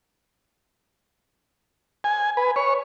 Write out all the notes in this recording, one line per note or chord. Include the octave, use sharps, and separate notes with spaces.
G#5
B4
C#5